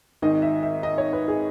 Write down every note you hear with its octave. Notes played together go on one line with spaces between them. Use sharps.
G#1 G#2 D#3 D#5
E5
E5
D#5
C#5
B4
G#4